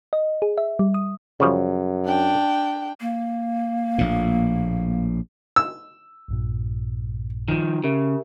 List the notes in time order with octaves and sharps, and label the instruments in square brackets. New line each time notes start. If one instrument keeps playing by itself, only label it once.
[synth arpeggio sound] D#5
G#4
E5
G3
D#6
[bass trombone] F#2 [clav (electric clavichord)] C#3 F3 G3
[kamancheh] D4 G5
[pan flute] A#3
[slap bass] A#1 A2
[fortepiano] E6
[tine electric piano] A#1 G2 A#2
[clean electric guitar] D#3 F3
[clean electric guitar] C#3 [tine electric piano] G4 A#4 E5